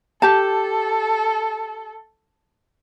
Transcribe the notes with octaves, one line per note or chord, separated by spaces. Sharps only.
G4 A4 A5